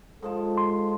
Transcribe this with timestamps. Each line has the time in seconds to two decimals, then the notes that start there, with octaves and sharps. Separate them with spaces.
0.22 G#2 F3 A4 A5
0.58 C6